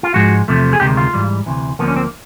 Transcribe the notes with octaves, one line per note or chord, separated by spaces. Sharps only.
F4
G#2 F3 G#3 F#4
E2 C3 F3 A3
G#4
D2 C3 D#3 G#3 G4
F4
G#2 E3 G3
D2 C3 E3
D2 D3 F3 A#3 B3
C#4
C4